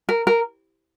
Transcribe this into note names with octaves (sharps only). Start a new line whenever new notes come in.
A#4
A#4